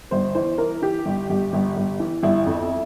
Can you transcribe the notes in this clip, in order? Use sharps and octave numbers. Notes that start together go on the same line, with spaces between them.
G1 C5
E3 C5
E3 A#4
E3 G4
G1
G1
G1
G1
E3
G1 E4
F2